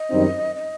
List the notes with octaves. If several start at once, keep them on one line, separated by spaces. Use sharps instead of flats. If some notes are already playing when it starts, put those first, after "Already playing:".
Already playing: D#5
F#2 D#3 G3 C4 D#4
D#5